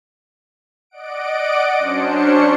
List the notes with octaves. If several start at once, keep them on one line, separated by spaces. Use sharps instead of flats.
D5 D#5 F#5 D7
F#3 C#4 D4 C5 C#7